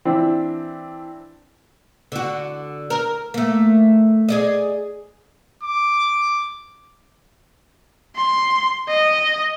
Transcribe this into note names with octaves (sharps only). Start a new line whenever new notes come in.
E3 C4 D4 E4
D3 F#4
A#4
A3 A#3
G#4 D5 D#5
D6
C6
D#5